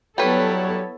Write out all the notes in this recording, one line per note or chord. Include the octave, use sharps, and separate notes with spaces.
F#3 G3 B3 E4 A4 B4 C#5